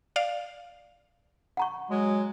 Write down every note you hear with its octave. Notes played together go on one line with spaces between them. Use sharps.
D5 F5
F#5 A#5 C#6
F#3 G#3